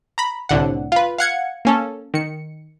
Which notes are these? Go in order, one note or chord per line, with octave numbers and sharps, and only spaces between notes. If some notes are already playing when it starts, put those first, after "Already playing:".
A#5 B5
C2 A2 D3 F#5
F4 B4
F5 F#5 G#6 C#7
A#3 C#4 A4
D#3 C#7